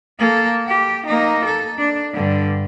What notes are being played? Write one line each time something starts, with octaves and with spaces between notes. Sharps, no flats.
A#3 A4
G4
A#3 D#4
A4
D4
G2 D3